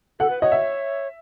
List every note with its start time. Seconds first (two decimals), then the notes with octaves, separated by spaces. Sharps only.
0.20 A4 F#5
0.30 B4
0.41 C#5 D#5
0.52 E5